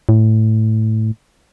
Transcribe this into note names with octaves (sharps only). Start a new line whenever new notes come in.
A2